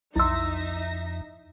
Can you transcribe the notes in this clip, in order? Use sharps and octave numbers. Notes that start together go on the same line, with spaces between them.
B1 F2 D#4 E4 E5 C6 E6 A#6